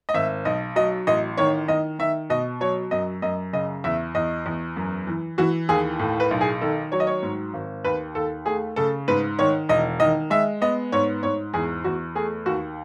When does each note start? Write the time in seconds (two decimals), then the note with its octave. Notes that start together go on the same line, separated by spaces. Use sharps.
0.09 D#5
0.14 G#1 E5
0.45 B1 D#5
0.76 F#3 D#5
1.07 A1 D#5
1.37 D#3 C#5
1.68 D#3 D#5
1.99 D#3 E5
2.30 B2 D#5
2.61 F#3 C#5
2.91 F#2 D#5
3.22 F#2 D#5
3.53 C#3 D#5
3.84 E2 E5
4.15 E2 D#5
4.46 E2
4.76 F#2
5.07 E3
5.38 E3 F#4
5.69 D#2 G#4
5.99 A2
6.20 B4
6.31 B1
6.41 G#4
6.61 D#3 A4
6.92 F#3 C#5
7.00 D#5
7.07 C#5
7.22 G#2
7.54 G#1
7.85 D#2 B4
8.15 D#2 A4
8.46 A3 G#4
8.76 C#3 A4
9.08 G#2 B4
9.39 D#3 C#5
9.69 E1 D#5
10.00 D#3 D#5
10.30 G#3 E5
10.61 B3 D#5
10.92 G#2 C#5
11.23 G#2 C#5
11.54 E2 G#4
11.84 E2 F#4
12.15 A3 G#4
12.46 D#2 F#4